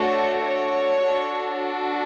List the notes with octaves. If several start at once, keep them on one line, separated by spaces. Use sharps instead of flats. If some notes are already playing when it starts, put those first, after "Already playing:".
Already playing: A3 D4 F#4 A4 C#5
C#5
D4 F#4 A4